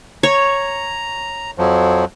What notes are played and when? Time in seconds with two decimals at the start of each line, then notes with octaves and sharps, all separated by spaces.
0.23 C#5 A#5
1.58 F2 F3 F#3